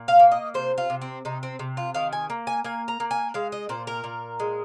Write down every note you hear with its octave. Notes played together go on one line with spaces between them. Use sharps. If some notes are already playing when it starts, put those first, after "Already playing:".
Already playing: A#2
F5
A#3
D#5
C3 C5
F4
C3
C4
C3 D#4
C4
C3
F4
D#3 F5
G#5
A#3
G#5
A#3 G#5
A#5
A#3
G#5
G#3 F5
D#5
A#2 C5
A#4
A#2
G#3